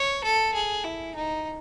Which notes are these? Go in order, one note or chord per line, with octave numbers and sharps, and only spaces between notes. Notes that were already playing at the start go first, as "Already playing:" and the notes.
Already playing: C#5
A4
G#4
E4
D#4